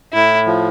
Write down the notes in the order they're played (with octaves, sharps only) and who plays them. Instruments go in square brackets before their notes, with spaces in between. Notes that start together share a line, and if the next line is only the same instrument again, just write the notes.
[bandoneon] A2 [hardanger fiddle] E4
[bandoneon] F3